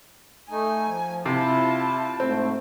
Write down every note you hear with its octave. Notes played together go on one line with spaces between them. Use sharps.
A3 D#4 G#5
F3
C3 E4 F4 A5
G#2 A3 C4